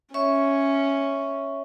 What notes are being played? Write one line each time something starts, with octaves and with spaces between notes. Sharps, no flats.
C#4 C#5 E5 C#6